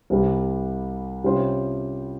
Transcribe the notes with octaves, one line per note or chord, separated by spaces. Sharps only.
C2 C3 G3
C3 G3 C#4 F4 C5